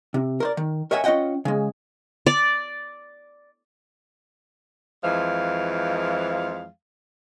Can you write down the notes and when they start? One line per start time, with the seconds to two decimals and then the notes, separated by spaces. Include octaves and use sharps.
0.14 C3
0.40 A#4 C5 D5
0.57 D#3
0.91 A#4 C#5 D#5 E5 F#5 G#5
1.04 C#4 F4 D#5 F#5 G5
1.45 C#3 G#3
2.26 D5
5.03 F2 E3 F3 G#3 F5